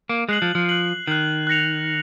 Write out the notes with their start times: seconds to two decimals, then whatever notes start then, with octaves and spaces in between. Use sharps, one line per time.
0.09 A#3
0.29 G#3 F#6 C7 F#7
0.42 F3
0.55 F3
0.69 F#6 C7 F#7
1.07 D#3 F#6 C7 F#7
1.47 F#6 A#6 C#7 F7